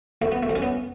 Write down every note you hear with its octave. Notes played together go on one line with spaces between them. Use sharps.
D2 A3
B3
A3
D2
C#4
B3